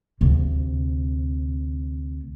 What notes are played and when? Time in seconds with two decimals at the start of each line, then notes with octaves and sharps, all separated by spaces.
0.21 D2 C3